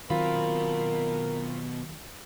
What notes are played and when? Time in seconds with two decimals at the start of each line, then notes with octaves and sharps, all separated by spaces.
0.10 B2 D#3 F#3 C4 F4 A#4 F5 B5